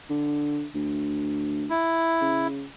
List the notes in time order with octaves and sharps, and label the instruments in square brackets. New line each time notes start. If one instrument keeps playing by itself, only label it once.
[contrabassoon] D3
D2
[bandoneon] E4
[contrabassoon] C#3